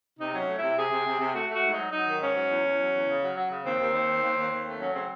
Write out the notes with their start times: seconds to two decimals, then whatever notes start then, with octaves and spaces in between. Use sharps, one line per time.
0.19 C3 D#4
0.34 F#3 C#4
0.48 A3
0.58 C3 E4
0.77 C3 G#4
0.91 C3
1.06 C3
1.20 C3
1.35 A3 F#4
1.49 A3 F#4
1.64 G#2
1.73 D#4
1.78 F#3
1.92 F#3 D#4
2.07 D#3
2.21 G#2 C#4
2.36 F#3
2.50 E2
2.64 E2
2.79 F#3
2.93 E2
3.07 C#3
3.22 F#3
3.36 F#3
3.51 C#3
3.65 D#2 C4
3.80 D#2
3.94 D#2
4.09 D#3
4.22 D#2
4.37 D#2
4.51 D#2
4.66 A3
4.80 F#3 C#4
4.94 C#3 C4